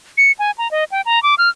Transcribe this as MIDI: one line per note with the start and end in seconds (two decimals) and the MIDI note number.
0.18 0.32 97
0.39 0.51 80
0.58 0.70 82
0.71 0.84 75
0.92 1.01 79
1.06 1.22 82
1.23 1.35 86
1.38 1.49 89